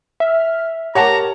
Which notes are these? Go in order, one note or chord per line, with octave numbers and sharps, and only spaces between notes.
E5 F6
G4 A#4 C#5 F#5 A5 A#5